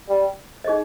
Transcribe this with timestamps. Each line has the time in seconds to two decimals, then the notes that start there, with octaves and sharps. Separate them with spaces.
0.09 G3
0.64 D#4 G#4 D#5